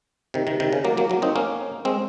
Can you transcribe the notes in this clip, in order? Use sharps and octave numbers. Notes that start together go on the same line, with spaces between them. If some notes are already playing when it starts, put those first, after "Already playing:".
C3 D#3
C3 D#3
C3 D#3
C#3
F#3 A#3
F#3 A#3
F#3 A#3
C4 D#4
A#3 C#4
G#3 C4